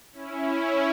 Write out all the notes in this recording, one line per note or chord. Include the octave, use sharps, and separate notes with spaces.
C#4 E4